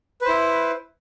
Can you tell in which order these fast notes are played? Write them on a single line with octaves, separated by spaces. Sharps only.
B4 C5 E4